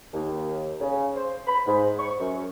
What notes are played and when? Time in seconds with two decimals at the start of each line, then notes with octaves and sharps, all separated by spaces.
0.14 D#2
0.81 C#3
1.15 C5
1.47 B5
1.66 G#2
1.99 C#6
2.20 F#2